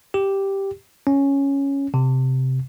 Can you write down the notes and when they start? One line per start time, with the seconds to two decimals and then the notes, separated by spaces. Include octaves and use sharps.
0.14 G4
1.07 C#4
1.94 C3